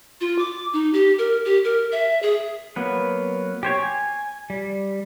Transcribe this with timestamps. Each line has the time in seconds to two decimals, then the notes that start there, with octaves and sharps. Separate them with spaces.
0.21 F4
0.39 D6
0.73 D#4
0.93 G4
1.19 A#4
1.45 G4
1.64 A#4
1.92 E5
2.22 G#4
2.76 F#3 A#3 B3 B4
3.63 G4 C5 C#5
3.79 G#5
4.50 G3